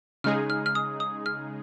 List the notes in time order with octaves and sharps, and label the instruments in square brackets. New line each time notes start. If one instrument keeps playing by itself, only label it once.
[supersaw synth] C#3 G#3 D#4 G#4 [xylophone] F6
[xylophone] F6
F6
D#6
D#6
F6